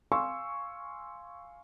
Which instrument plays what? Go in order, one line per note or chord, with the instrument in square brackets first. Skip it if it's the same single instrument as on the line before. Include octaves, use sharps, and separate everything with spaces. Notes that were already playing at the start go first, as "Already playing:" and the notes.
[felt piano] F5 G#5 C6 C#6 E6